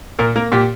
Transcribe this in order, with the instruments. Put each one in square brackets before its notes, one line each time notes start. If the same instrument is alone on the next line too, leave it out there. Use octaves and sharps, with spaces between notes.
[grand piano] A#2 A#4
A#3 A#4
A#2 G4